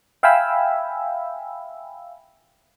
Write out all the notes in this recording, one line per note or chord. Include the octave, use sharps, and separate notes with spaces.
E5 F5 G5 G#5 B5 E6